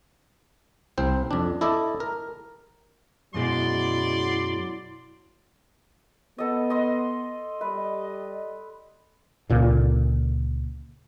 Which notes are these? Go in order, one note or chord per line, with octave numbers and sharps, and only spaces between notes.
C2 C4 C5
F2 D4
E4 A4 D5 D#5
A#4
F#2 B2 F#3 G#3 E4 D5 C6
B3 A4 D#5
D#5 C6
G3 B4 D5 D#5
C#2 A#2 D3